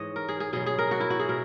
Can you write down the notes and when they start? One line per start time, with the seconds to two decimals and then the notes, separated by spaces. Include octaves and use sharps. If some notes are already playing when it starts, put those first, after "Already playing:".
Already playing: G#2 E3 C#5 D#5
0.16 A#4
0.29 G#4
0.40 G#4
0.53 B2 F#3 G#4
0.66 G#4
0.79 A#4
0.91 F#4
1.00 E4
1.10 F#4
1.19 G#4
1.29 B2 A#4